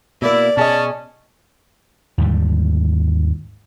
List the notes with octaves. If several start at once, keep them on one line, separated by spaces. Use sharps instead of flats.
B2 A#3 E4 D5
B2 C#4 G#4 D#5 A5
D#2 G#2 D3 G3